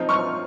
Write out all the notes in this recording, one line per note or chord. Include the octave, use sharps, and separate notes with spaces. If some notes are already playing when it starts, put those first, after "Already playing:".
Already playing: F3 C4 D#4
C#6 F6